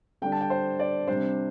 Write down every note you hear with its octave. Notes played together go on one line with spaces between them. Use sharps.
D3 G3 D4 G5
A5
G5
C5
D5
C3 G3 D4 C5